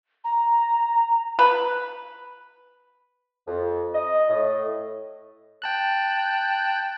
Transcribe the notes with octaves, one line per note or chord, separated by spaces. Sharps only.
A#5
B4
F2
D#5
A2
G5 A5 F#6